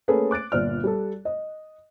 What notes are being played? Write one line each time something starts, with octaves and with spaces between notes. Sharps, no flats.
A3 A#3 C#4 G#4 A4 B4
D6 F#6 A6 D7
G1 A#2 D5 F6
G3 A4
D#5